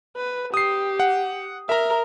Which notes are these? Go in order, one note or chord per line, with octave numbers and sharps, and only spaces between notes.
B4
G4 D#6 C7
F#5
A#4 E5 A#5